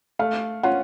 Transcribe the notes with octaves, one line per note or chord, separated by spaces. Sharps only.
A3 F5
C#4 F4 F#5